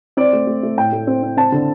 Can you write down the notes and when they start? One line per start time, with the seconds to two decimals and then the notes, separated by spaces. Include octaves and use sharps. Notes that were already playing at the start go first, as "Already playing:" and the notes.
0.17 C4 D5
0.33 A3
0.47 A3
0.63 A3
0.77 A2 G5
0.92 A3
1.07 C4
1.23 C4
1.37 C4 A5
1.52 D3